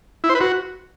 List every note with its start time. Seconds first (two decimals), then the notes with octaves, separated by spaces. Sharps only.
0.24 E4
0.29 C5
0.35 B4
0.41 F#4